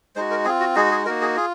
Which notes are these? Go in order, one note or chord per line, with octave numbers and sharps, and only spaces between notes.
G#3 D#4 F#4 C5
A#4
C4 F4 G#4
F#4
G#3 D#4 F#4 G#4
G#4
A#3 D#4 F#4 A#4
G#4
F4 G#4